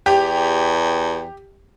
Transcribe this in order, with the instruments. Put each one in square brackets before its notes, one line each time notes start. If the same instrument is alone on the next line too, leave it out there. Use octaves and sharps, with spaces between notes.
[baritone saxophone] E2 [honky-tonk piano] G4